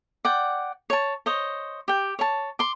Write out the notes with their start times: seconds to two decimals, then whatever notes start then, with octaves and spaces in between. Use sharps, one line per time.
0.25 D5 F#5 G5
0.90 C#5 A5
1.26 C5 C#5 D#5
1.88 G4 G5
2.19 C#5 A5
2.59 C6 D6